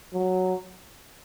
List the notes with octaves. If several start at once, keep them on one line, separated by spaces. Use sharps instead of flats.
F#3